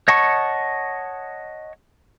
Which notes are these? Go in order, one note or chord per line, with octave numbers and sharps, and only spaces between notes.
C#5 D#5 F#5 A5 C#6